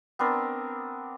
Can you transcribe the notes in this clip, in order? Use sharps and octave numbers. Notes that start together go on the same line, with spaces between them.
B3 C4 D4 A#4